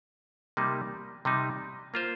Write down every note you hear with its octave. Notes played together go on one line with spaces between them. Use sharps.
C3 G3 A#3 D#4
C3 G3 D#4
A#3 F4 C5